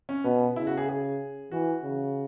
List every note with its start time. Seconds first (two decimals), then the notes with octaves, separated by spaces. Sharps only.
0.09 C#4
0.24 B2 B3
0.56 C#3 E4
0.67 F#4
0.77 G#4
0.89 G#4
1.51 E3 F#4
1.84 C#3